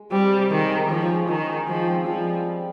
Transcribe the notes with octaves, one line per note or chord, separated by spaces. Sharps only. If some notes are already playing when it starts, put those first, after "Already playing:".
Already playing: G#3
G3 C4
C3
D#3 G#3
G#3
F3 C#4
G#3
D#3 D#4
G#4
F3 G#3
C4
F3 G3
G3
G4